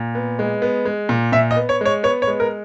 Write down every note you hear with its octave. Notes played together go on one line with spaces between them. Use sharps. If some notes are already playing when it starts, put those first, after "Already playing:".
Already playing: A#2
B3
G#3
B3
G#3
A#2
A#2 E5
D#5
B3
C#5
G#3 C#5
B3 C#5
C#5
G#3
A#4